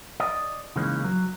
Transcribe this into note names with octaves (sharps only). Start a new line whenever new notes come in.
D5 D#5
C#3 E3 G#3 A#3 C#4 D#4
F#3